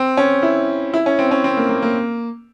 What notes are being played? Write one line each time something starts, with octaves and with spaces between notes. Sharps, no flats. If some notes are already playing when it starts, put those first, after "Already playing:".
Already playing: C4
C#4
E4
E4
C#4
C4
C#4
C4
A#3
A#3
A#3